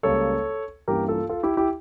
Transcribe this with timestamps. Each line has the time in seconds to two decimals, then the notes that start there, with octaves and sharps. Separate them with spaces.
0.03 C#2 C#3 G3 A#3 A4 C#5
0.88 G2 E3 A#3 C#4 G4 A#4
1.08 F4 A4
1.29 F4 A4
1.43 E4 G4
1.57 E4 G4